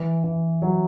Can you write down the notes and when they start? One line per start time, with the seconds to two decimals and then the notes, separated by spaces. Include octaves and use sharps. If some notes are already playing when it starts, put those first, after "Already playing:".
Already playing: E3
0.24 E3
0.62 F#3